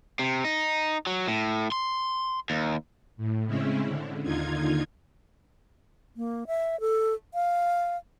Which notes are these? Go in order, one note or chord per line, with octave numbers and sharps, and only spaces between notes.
C3
D#4
F#3
A2
C6
D#2
A2
C#3 G#3 C4 C#4 E4
D3
D#2 D3 D#4 F4 G#6
A#3
E5
A4
F5